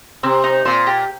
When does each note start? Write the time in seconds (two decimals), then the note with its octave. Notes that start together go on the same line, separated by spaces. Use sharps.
0.23 C3 C4
0.44 D#4
0.65 A#2 C4
0.87 G4